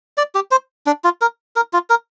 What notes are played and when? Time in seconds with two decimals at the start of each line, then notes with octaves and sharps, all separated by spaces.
0.18 D5
0.35 G4
0.51 C5
0.86 D4
1.04 F4
1.21 A#4
1.56 A#4
1.73 F4
1.90 A#4